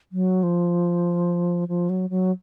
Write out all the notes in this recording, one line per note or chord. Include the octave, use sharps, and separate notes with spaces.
F#3
F3
F3
F#3
F#3